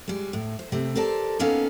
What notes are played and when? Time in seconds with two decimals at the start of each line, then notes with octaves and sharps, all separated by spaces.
0.08 G3 G#3
0.33 A2
0.59 C5
0.72 C3 A3 C4
0.96 G4 A4 A#4 C5 D5 A5
1.39 A#3 B3 C#4 D#4 A4 F5